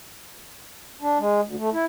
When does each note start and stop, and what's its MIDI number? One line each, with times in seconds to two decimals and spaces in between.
1.01 1.18 62
1.19 1.41 56
1.43 1.56 38
1.58 1.70 57
1.73 1.85 64